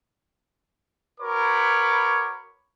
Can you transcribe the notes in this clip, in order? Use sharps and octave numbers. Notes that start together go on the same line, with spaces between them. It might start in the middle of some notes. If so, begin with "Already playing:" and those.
F#4 A#4 B4 C#5 B5 D6